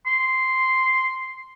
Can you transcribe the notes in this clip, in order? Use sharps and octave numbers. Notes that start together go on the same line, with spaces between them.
C6